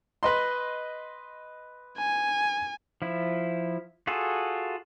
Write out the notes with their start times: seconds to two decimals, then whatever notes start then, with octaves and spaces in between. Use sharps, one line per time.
0.23 B4 D#5 C6
1.98 G#5
3.02 F3 E4
4.07 F4 F#4 G#4 A4